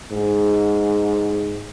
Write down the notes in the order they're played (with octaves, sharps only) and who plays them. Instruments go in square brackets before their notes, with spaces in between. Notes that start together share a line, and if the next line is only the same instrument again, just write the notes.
[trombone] G#2